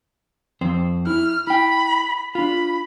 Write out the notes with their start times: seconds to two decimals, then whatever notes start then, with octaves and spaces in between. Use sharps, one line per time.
0.61 F2 C4 C5
1.07 E4 F6
1.47 E4 G5 B5
2.35 D4 F4 B5